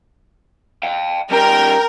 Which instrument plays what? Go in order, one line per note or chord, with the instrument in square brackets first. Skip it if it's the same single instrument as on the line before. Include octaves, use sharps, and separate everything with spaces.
[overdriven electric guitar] F5 G5
[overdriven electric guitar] G3 C#4 [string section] A#4 [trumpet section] G5